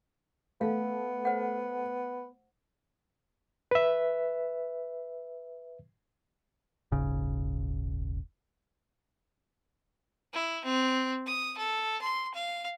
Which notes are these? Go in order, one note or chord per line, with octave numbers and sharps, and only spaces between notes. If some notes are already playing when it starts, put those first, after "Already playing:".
A3 B3 F5
C5 F#5
B4 E5
D#1 G#1 C#3
E4
C4
D#6
A4
C6
F5